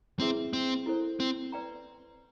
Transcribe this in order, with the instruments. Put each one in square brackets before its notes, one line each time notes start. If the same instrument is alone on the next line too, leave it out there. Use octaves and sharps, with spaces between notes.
[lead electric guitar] C4 [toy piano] E4 G#4 B4 E5
[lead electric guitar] C4
[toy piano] E4 A4 C5
[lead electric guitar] C4
[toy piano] B4 D5 G5 A#5